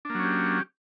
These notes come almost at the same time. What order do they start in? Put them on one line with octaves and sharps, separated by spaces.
D4 A#3 F#3 C#4 G4